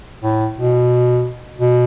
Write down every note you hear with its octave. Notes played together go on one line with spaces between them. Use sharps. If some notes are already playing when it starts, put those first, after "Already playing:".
A2
B2
B2